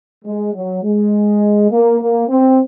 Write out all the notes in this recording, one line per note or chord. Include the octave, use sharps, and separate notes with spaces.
G#3
F#3
G#3
A#3
A#3
C4